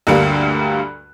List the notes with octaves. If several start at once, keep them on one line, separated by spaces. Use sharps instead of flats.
D2 G2 D3 G3 A#3